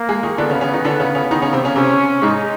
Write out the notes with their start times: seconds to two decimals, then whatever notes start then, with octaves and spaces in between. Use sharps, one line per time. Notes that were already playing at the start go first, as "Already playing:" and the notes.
Already playing: A#3
0.09 G#3 G#4
0.23 D#3 D#4
0.38 D3 B3 D4
0.50 C#3 C#4
0.61 C#3 C#4
0.73 D#3 D#4
0.84 D3 D4
0.99 C#3 C#4
1.15 C#3 C#4
1.31 D#3 D#4
1.42 C#3 C#4
1.53 C3 C4
1.65 C#3 C#4
1.76 C3 C4 C#4
2.22 G#2 G#3 D#4